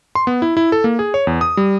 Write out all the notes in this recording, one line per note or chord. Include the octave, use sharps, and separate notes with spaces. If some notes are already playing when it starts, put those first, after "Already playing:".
C6
B3
E4
E4
A4
A#3
G#4
C#5
E2
D#6
G3